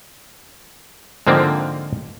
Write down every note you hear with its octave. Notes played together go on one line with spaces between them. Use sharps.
G#2 D3 F3 A#3 C4